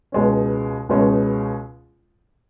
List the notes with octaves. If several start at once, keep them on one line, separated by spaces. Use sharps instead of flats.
C#2 B2 G#3 C#4
C#2 B2 G#3 C#4